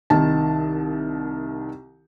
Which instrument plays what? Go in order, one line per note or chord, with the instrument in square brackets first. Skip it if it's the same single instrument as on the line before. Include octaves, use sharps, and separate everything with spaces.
[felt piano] C2 D#3 A5